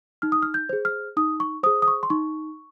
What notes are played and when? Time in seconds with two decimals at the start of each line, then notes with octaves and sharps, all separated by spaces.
0.22 D#4 F6
0.32 D#6
0.42 F6
0.54 G6
0.69 G#4 C5
0.85 F6
1.17 D#4 D#6
1.40 C#6
1.63 G#4 C5 D#6
1.82 D#6
1.88 C#6
2.03 C6
2.10 D#4 C#6